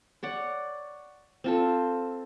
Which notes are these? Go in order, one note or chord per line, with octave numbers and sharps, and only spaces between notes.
C#5 D5 F#5
C4 F4 A4